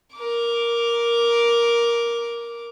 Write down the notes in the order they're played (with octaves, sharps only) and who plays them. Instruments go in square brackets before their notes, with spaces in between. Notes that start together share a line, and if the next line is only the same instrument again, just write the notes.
[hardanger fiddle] A#4 D6